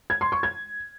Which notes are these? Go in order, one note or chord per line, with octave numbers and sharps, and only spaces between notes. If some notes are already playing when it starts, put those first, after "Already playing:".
G#6
C6
C#6
G#6